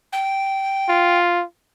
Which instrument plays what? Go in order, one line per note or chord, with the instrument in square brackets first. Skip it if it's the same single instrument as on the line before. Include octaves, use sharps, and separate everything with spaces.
[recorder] G5
[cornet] F4